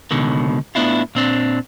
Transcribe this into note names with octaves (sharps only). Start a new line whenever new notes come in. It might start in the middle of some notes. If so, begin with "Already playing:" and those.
C#2 B2 D3 D#3
A2 B3 D4 E4 F4
A#2 C4 D4